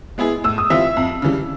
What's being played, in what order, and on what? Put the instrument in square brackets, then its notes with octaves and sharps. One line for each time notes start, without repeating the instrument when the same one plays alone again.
[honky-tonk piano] G#3 B3 E4 G#4
[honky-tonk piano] A2 [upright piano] E6
[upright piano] D#6
[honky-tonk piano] E3 G3 C4 F4 [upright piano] E5 E6
[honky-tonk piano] F2
C#3 E3 G3